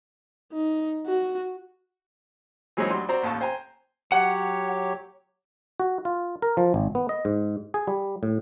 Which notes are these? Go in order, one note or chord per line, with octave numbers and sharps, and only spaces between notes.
D#4
F#4
E3 F#3 G#3 C4 C#4 D#4
D2 F#3 G3 D4 C6
C4 F#4 C5 D5 A#5
A1 D#2 F5 A5 C#6
C5 G5 G#5 A#5
F#3 G4 C#5 F#5
F#4
F4
A#4
F3
G#1
B3
D#5
G#2
G#4
G3
A2